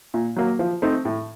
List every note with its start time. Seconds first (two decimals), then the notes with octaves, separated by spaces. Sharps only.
0.14 A#2
0.36 F#3 A#3
0.59 F3
0.82 A3 C4 D#4
1.05 A2